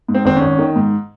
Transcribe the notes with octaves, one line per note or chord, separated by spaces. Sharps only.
G#2
C4
G#1 C4
C#4
G#1
D#3
G#2